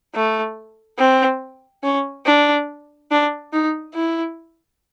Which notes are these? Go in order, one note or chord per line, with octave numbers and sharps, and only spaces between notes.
A3
C4
C#4
D4
D4
D#4
E4